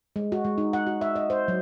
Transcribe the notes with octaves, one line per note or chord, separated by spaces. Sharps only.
G#3
F#4
G#3
D#4
F#5
F#4
E5
D#5
C5
F#3